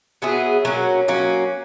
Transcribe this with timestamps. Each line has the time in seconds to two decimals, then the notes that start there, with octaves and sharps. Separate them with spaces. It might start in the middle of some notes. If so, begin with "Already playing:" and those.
0.22 F#3 B3 E4 G#4
0.65 F#3 A#3 C#4
1.08 F#3 A#3 C#4